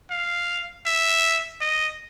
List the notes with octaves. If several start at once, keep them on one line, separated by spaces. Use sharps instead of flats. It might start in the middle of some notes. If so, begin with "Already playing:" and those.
F5
E5
D#5